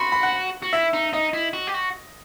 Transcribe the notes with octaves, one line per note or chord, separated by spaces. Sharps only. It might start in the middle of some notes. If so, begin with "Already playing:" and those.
Already playing: F#4 B5 C6
B5
F#5
F#4
E4 E5
D#4
D#4 D#5
E4
F#4
G4
F#4